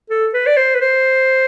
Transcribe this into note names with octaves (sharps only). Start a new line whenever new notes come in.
A4
B4
D5
C5
B4
C5